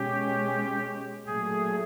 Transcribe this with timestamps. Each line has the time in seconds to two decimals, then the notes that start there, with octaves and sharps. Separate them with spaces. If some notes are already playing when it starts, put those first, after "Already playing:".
Already playing: B2 G#3 C#4 G4
1.26 A#2 F#3 A3 G#4